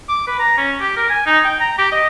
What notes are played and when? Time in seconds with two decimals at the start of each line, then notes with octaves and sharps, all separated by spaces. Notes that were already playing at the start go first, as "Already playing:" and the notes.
0.09 D6
0.28 B4
0.39 A#5
0.58 C#4
0.80 G4
0.97 A#4
1.10 G#5
1.26 D#4
1.45 G5
1.61 A#5
1.78 G4
1.92 D#5